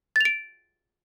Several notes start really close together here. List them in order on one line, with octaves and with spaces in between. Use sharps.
A6 F7 D7